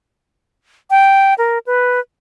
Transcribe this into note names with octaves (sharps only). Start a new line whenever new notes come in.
G5
A#4
B4